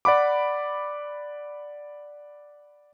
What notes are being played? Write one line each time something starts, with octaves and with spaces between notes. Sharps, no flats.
D5 F#5 B5 D6